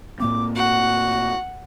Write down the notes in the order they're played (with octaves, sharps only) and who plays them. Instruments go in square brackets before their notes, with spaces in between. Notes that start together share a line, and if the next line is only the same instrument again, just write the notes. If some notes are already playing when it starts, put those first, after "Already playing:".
[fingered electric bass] A2 A#3 C4 [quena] D6
[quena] F#4 [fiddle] F#5